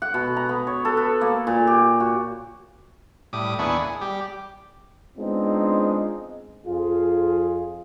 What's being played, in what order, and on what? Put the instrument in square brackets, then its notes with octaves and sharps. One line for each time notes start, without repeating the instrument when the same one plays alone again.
[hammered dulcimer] F#5
B2
A#5
B3
C#5
A4
B4
A#3
A#2
G4
F#4
[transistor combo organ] A2 G3 D6 D#6
D#2 B3 D4 E4 G#4 C#6
G#4
G3 G4
[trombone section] G#3 B3 C4 D4 D#4 F4
F2 F4 G#4